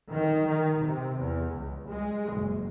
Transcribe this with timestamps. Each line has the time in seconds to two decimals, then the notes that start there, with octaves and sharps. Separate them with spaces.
0.10 D#3
0.47 D#3
0.84 C3
1.20 E2
1.53 C#2
1.89 G#3
2.32 F#1